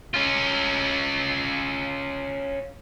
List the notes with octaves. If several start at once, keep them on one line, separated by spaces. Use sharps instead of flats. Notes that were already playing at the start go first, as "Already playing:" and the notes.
C#4 F4